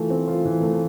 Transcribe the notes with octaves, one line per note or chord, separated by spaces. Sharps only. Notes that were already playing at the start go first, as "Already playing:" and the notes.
Already playing: E3 A3 F4
C4
F4
E3
A3